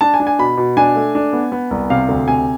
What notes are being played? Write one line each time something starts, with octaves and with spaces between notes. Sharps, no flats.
D4 A5
G#5
D4
G#5
B2 B5
B2
D4 G#5
A3
D4
B3
B3
C2
C3 F5
D2
C3 G#5